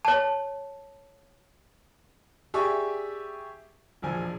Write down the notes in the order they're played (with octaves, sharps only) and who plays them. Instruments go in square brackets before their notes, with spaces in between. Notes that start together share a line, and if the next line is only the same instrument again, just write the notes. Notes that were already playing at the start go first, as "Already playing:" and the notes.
[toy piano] C#5 A5
[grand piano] G4 G#4 D5 E5 C#6 D#6
E1 A#1 F3 G#5